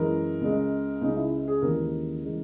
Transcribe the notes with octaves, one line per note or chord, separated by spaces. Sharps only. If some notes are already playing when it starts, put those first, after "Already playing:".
Already playing: F#2 E3 G#3 A#4
C#2 C#3 G#3
C#2 C#3 G#3 D#4
E4
G#4
D#2 C#3 E3 G#3 A#4
C#3 E3 G#3